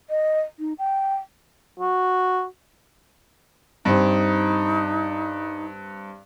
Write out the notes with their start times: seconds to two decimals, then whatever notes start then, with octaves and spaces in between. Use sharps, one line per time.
0.10 D#5
0.59 D#4
0.78 G5
1.80 F#4
3.85 G2 C4 D#4